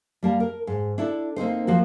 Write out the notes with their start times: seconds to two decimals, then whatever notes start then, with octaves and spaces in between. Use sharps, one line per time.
0.23 G3 A#3 A5
0.40 A#4
0.67 G#2
0.98 D4 E4 A4
1.36 A#3 C4 D#4 C5
1.67 F3 A#3 F#4